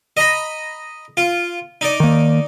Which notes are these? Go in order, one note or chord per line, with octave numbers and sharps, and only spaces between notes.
D#5 A#5 B5
F4
D#4 D5
D#3 A#3